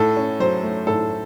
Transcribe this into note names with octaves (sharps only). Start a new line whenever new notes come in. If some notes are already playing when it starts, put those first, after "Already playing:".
Already playing: A2 A4
C#4
F#3 C5
A3
A2 A4